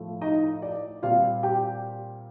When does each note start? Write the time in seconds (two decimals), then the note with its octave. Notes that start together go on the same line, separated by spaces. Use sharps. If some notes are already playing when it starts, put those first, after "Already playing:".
Already playing: A2 F3 A3
0.21 D#4 D#5
0.62 D5
1.02 A#2 G3 C4 F4 F5
1.43 G4 G5